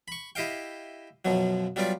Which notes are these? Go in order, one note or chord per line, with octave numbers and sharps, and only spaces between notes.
B5 C#6
E4 G4 D#5 F5 G5
F#2 B2 F3 F#3
F#3 G3 B3 F4 D5